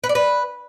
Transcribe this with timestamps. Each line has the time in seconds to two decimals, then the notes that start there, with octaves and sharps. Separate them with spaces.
0.04 B4
0.09 D5
0.15 B4